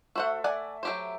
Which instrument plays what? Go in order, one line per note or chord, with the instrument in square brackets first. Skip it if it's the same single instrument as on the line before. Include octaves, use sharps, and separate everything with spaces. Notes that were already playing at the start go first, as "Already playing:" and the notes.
[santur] A3 E5 [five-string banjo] F#4 C5 F#5
[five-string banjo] D5 F#5 G#5
F#3 G4 C5